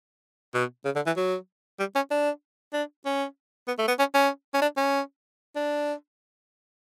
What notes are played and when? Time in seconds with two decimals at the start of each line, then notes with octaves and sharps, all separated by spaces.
0.54 B2
0.85 C#3
0.96 D3
1.06 E3
1.16 F#3
1.79 G3
1.96 C#4
2.11 D4
2.73 D4
3.05 C#4
3.67 B3
3.78 A3
3.88 B3
3.99 C#4
4.14 C#4
4.54 C#4
4.62 D4
4.77 C#4
5.56 D4